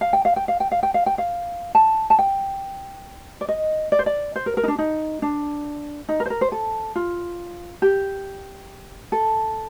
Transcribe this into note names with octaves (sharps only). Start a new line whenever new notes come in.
F5
G5
F5
G5
F5
G5
F5
G5
F5
G5
F5
A5
A5
G5
D5
D#5
D5
C5
D5
C5
A#4
A#4
D#4
D4
D#4
D4
D#4
A#4
C5
A#4
C5
A4
F4
G4
A4